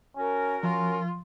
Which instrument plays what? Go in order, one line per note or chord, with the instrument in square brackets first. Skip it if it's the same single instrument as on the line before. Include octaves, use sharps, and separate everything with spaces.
[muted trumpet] C#4 [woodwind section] F#4 A#4
[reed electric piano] F3 [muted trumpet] C#4 [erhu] F4